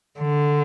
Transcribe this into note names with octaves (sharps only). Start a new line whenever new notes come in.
D3